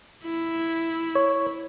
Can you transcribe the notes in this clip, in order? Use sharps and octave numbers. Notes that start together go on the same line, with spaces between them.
E4
C#5